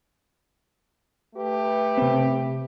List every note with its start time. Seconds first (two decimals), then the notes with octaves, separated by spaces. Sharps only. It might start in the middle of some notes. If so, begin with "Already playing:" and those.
1.35 A3 G4 B4
1.97 C3 C4